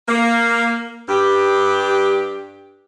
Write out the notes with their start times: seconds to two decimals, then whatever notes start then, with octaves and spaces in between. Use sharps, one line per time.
0.08 A#3
1.09 G2 G4